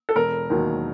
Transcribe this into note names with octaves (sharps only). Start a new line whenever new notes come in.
A4
E1 A#4
D#2 D#3 F#3